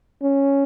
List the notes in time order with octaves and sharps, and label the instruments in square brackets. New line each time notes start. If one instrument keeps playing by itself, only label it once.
[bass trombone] C#4